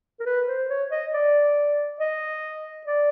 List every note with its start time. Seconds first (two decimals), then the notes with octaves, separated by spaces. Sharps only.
0.20 A#4
0.26 B4
0.48 C5
0.70 C#5
0.91 D#5
1.14 D5
2.00 D#5
2.87 D5